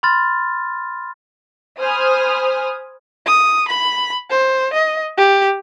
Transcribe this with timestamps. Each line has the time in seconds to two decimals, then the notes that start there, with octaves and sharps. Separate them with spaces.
0.03 B5 C6 F6 A6
1.80 C5 G#5 B5 D#6 F6
3.26 D#6
3.68 B5
4.30 C5
4.73 D#5
5.18 G4